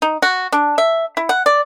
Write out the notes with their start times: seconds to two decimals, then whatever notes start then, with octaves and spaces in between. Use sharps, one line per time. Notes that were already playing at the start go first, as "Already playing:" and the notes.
0.02 D#4
0.22 F#4
0.52 D4
0.78 E5
1.17 E4
1.29 F#5
1.46 D5